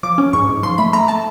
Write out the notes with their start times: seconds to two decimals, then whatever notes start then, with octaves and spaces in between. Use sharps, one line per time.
0.03 F3 D6
0.18 C#4
0.33 G#2 C#6
0.49 G#2
0.63 F3 C6
0.78 A3 B5
0.93 A3 A#5
1.08 A3 A5